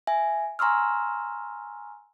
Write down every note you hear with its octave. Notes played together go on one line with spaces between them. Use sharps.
E5 G#5
G#5 A#5 C6 C#6 E6 F6